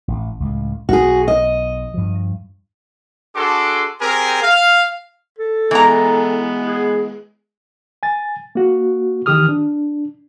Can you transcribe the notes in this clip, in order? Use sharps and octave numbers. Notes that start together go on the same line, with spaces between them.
A1
C#2 A2
B1 F#4 G#4
D#5
G2 F3
D4 F#4 G#4 A4 C6 D6
C4 G4 G#4 A#4 G#5
F5
A4
E3 G#3 B3 A#5
G#4
G#5 A6
A#3 F#4
D#3 E3 G4 D#6 F6
D4